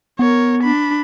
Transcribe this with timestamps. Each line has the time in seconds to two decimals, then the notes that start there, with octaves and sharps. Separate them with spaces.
0.19 B3 A#4 C#5
0.63 D4 B5